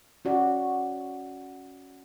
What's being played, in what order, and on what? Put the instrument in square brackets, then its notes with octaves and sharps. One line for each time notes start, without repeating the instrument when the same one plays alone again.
[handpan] C#4 F#4 D5